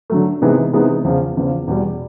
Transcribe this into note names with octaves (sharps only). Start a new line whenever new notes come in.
D3 F#3 A3
C3 E3 G#3 B3 D#4
C3 E3 G#3 B3 D#4
E2 C#3 F3
E2 C#3 F3
E2 B2 G3